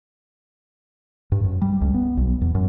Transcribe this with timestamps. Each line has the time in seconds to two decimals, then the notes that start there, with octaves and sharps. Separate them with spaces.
1.32 G2
1.45 F#2
1.62 G3
1.81 C#2
1.94 B3
2.17 B1
2.41 E2
2.55 F#2